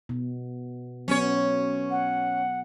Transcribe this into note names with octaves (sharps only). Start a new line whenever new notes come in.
B2
F#3 B3 C#4 C#5
F#5